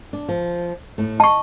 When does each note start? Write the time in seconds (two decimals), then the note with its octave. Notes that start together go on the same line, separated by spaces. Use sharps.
0.13 D4
0.29 F3
0.98 A2 A3
1.20 D#5 A5 C#6